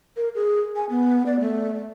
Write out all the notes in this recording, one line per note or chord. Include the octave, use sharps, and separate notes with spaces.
A#4
G#4
G#5
B3
D5
A3